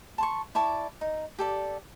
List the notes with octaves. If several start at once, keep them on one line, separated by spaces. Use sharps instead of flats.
A5 C6 C#6
E4 D5 A5 C#6
D#4
G4 A4 D5